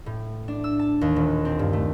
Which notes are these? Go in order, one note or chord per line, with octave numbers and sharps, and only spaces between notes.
A2
D4
E6
A5
D#2
D#1
C4
G2
A3